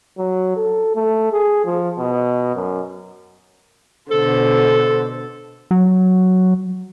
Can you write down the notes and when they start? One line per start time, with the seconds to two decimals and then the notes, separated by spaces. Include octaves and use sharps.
0.18 F#3
0.56 A4
0.95 A3
1.32 G#4
1.65 F3
1.98 B2
2.55 F#2
4.11 B2 D3 A4 C5
5.71 F#3